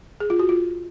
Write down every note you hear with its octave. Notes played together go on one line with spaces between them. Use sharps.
G#4
F4
F#4
F4